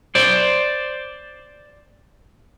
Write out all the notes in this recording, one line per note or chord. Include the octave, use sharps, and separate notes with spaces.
C5 D5